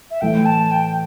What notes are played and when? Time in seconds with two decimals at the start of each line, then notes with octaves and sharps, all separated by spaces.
0.11 E5
0.21 A2 E3 A3 G5
0.46 A5
0.71 G5